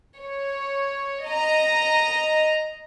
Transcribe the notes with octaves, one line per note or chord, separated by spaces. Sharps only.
C#5
D#5 A#5